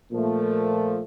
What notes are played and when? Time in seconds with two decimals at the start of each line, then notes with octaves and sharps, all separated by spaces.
0.12 A#2 F3 A3